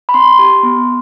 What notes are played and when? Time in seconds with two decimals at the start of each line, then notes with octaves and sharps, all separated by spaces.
0.09 B5
0.14 C4 C6
0.39 G4
0.63 B3